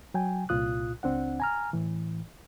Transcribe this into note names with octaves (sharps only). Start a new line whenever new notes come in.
F#3 G5 G#5
C2 A#2 F4 D#6 F#6
C#2 C4 D4 F#5
G#5 A#5 F6
A2 E3